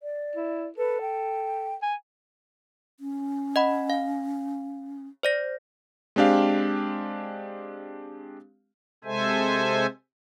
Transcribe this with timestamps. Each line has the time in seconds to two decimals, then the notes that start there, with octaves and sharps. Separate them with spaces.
0.03 D5
0.35 E4
0.78 A4 B4
1.01 G5
1.82 G#5
3.00 C#4
3.56 D#5 F#5 B5
3.90 F5
5.23 C5 D5 A#6
6.16 G#3 C4 D4 G4 F5
9.04 C3 G#3 A4 C5 E5 G#5